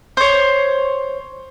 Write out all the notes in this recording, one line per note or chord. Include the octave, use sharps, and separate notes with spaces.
C5 C#5